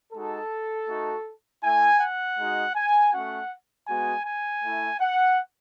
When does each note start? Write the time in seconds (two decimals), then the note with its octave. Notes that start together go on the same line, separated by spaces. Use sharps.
0.13 G#3 D#4 F#4 A4
0.87 A3 D#4 F#4
1.63 A3 E4 G#5
2.00 F#5
2.38 G#3 D#4 F#4
2.75 G#5
3.13 A3 C#4 F#4 F#5
3.87 G#3 B3 F#4 G#5
4.25 G#5
4.63 A3 E4
5.00 F#5